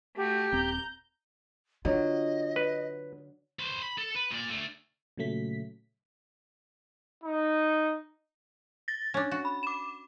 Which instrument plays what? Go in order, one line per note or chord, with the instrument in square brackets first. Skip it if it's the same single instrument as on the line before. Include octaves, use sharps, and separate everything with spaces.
[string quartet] A3 F#4 [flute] G4
[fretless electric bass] D#1 C4 [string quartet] A#5 G6
[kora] D3 F#3 [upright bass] F4 [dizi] D#5
[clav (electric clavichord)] B4
[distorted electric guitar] B4 C5
B5
A4
B4
A#2 D5
A3 D4
[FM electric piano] A#2 C#3 F#3 A3 B6
[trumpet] D#4
[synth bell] A6 A#6
[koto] C#4 D4
F#4
[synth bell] B5
D6 E7